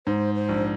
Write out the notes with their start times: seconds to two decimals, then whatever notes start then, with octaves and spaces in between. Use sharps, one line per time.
0.07 G#2 C5
0.35 C5
0.49 A#1